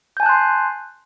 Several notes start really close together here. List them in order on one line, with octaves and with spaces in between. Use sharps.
G6 G#5 A5 F#6 C6